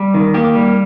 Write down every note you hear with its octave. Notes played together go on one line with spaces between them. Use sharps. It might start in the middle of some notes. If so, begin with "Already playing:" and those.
Already playing: G3
D#3
A#3 G4
G3